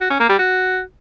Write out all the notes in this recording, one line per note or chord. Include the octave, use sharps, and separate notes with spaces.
F#4
C#4
A#3
G3
F#4